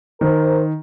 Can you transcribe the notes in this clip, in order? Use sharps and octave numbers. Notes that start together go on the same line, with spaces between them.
D#3 A#4 C5